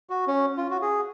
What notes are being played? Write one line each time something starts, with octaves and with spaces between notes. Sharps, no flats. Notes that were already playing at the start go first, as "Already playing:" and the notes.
F#4
C#4
F4
F#4
G#4